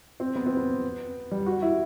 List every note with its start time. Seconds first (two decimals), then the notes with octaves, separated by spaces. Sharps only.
0.20 C4
0.35 B3
0.46 C4
0.57 B3
1.31 G3
1.46 F#4
1.62 E4